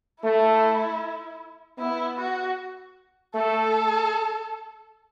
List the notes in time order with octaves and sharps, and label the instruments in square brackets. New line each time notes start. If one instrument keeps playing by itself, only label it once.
[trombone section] A3 [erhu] E4
[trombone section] B3 [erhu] E4
[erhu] F#4
[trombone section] A3 [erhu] A4